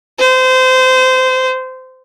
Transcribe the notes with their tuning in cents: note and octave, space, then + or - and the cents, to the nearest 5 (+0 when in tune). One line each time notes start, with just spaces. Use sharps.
C5 -25